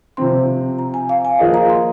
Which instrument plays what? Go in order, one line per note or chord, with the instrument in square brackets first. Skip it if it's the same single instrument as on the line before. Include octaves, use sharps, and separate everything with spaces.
[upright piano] C3 F3 C4 [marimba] C6
[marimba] A#5
G#5
F5
G#5
[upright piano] F3 A#3 F4 G#4 D#5 [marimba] F5
[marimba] A#5
A#5
C6